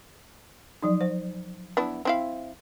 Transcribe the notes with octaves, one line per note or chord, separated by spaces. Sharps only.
F3 F#3 D#4
C5
B3 D4 E4
C4 E4 F5